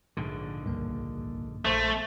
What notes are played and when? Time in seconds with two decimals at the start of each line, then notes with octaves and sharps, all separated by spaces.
0.17 A#1 G#2 D3
0.65 C#2 G2 A#3
1.65 A#1 A3 C5